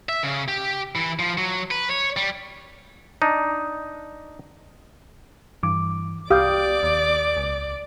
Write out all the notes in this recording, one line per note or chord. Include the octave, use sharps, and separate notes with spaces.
E5
C#3
G4
E3
F3
F#3
B4
C#5
G3
D4 D#4
G2 E3 D6
C2 G4 D5 F5 D6 D#6 G6
D#2
C#2